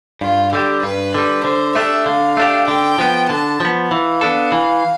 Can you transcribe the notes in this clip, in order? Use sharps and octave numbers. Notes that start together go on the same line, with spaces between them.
G2 F4
D3 G3 G4
G2 B4
D3 G3
D3 C5
A3 D4 G4 E5
D3 F5
A3 D4 G4
D3 G5
F3 B3
D3 A5
F3 B3
E3 F5
B3 D4 A4
E3